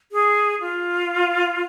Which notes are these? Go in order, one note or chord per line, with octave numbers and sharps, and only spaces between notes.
G#4
F4